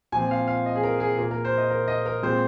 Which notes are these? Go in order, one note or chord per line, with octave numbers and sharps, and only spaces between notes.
A#2 F3 C4 G#5
F5
F5
D#5
G#4
A#4
G#4
A#2 A#3 A#4
A#4
C5
D#5
A#4
D#5
A#4
A#2 G#3 C4 C5